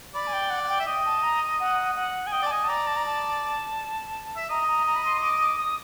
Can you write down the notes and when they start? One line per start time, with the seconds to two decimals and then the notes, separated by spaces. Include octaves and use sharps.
0.14 D5 B5
0.27 G#5
0.33 G5
0.50 F#5
0.63 F#5
0.69 G5
0.80 E5
0.87 D#5 G5
1.05 A5
1.23 A#5
1.60 F#5
1.95 F#5
2.27 G#5
2.32 D#5 G5
2.42 D5 A5
2.51 D#5 G#5
2.64 A5
2.68 D5 A#5
2.87 A5
2.96 A#5
3.06 A5
4.36 E5
4.49 D#5 A#5
4.68 A#5
4.86 A#5
4.95 B5
5.05 C6
5.18 D#6
5.22 D6
5.40 D6
5.59 D#6